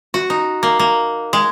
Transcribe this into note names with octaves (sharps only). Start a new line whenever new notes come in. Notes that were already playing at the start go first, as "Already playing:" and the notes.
F#4
D#4
A#3
A#3
G#3